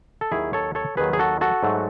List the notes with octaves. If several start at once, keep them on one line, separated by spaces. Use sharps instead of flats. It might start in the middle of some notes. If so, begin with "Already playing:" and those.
A4
D#2 D#3 F#3 E4 G#4
A4 C#5
A4 C#5
D#2 D#3 F#3 G#4 B4
G#4
F#4 A4
F#4 A4
G#2 F#3 A3